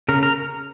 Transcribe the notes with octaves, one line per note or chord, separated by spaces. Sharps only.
C#3 A#4
A#4